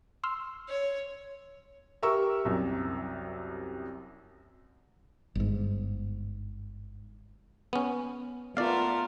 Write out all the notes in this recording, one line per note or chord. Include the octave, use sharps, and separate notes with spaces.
C6 E6 F6
C#5
G4 A#4 E5 C#6 E6
C2 F#2 C3
G1 G#2
B3 C#4
A3 B3 F4 A#4 D5 F5